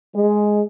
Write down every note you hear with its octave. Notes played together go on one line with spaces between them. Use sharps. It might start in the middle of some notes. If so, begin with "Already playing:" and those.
G#3